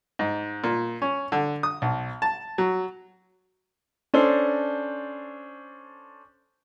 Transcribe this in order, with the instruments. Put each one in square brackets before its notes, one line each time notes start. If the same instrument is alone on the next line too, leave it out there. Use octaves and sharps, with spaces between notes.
[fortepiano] G#2
A#2
C#4
D3
D#6
B1
A5
F#3
[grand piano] C#4 D4 A4 C5